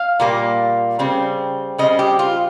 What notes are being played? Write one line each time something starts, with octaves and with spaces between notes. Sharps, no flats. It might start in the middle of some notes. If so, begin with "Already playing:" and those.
Already playing: F5
A#2 G3 A#3
C#3 G3 C4
C#3 G3 C4 D#5
G4
F4